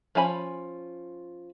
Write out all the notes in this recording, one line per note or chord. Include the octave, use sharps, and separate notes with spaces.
F3 C#4 G#5 B5